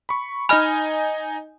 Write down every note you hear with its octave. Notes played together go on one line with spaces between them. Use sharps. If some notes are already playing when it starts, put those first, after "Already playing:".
B5 C#6
D#4 D#5 G#5 B5 F6